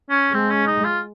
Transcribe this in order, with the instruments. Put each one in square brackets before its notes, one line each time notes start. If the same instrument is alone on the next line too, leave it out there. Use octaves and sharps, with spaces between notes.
[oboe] C#4
[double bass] G#3 [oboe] C4
[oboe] C#4
D#4
F4